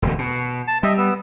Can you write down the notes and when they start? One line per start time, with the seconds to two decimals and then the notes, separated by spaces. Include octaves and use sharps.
0.02 E1 D2 A2
0.18 B2
0.67 A5
0.83 G3 D#5 E5
0.98 B3 E6